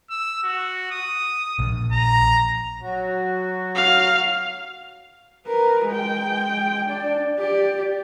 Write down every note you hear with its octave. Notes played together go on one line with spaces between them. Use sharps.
E6
F#4
D#6
A#1
A#5
F#3 F#4
F5
A#4 B4
G#3 G5
D4 D5
G4 D5